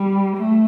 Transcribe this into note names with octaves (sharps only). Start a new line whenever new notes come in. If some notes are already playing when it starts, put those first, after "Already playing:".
Already playing: G3
A3